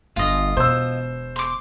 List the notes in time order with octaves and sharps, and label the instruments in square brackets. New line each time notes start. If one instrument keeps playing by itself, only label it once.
[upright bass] G1 [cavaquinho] F4 D#5
[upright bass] E1 B2 [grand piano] C5 E6
[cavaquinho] C6 D6